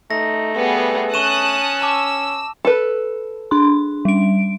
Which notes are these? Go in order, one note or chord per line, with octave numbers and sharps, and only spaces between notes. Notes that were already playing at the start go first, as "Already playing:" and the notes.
A3 D#4 A#6
G3 B3 G#4
C#4 A5 C#6 D#6 F#6 D#7 E7
A5 D6 E6
A4 B4
D4 C6
G3 D7